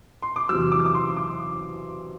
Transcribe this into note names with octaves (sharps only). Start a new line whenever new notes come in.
C6
D6
E2 C3 F#3 E6
D6
E6
D6
C6
D6